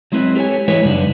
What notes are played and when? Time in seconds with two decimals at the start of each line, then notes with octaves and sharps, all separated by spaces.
0.12 F#3 G#3 C4 E4 B4
0.35 G4 A4 C5 C#5 G#5
0.68 E3 G#3 E4 B4 C#5
0.84 F#2 C#3 G3 D4 D#4